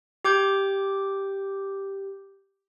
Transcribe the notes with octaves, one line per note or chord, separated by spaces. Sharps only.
G4 D6 G6